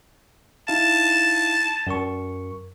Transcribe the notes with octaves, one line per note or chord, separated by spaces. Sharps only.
D#4 E4 F5 A5
F#2 A#4 C#6